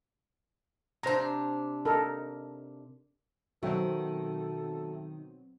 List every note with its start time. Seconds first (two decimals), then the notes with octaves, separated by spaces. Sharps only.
1.03 C3 D4 C5 A#5
1.85 D#4 A4 A#4
3.63 B2 D#3 F#3 C4 F#4 A4 E5 G5